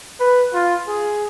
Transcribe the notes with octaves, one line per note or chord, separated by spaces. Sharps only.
B4
F4
G#4